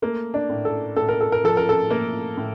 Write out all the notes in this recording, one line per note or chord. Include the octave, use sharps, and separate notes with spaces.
A3 A#3
D4
A2
A4
A2 A4
A#4
A4
A#4
F3 A4
A#4
A4
A3 A#3
A2